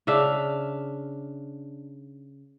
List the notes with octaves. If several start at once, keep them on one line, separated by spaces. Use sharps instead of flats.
C#3 D4 E5 F5